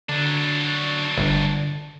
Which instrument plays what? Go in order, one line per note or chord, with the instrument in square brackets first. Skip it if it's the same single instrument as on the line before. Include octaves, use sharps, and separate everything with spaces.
[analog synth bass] D3 [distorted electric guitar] F#3 D4
[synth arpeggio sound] G1 [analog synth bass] D3